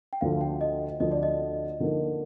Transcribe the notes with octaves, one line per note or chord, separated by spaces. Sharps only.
G5
D2 D3 F3 F5
G5
D#5
D2 D3 F3 D#5
D5
D#5
D3 F3 A#3 D#4